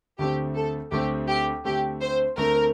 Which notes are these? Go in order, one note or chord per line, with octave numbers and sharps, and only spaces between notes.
D2 D3 A3 C4 G4
A4
D2 D3 A3 C4 G4
G4
D2 D3 A3 C4 G4
C5
D2 D3 A3 C4 A#4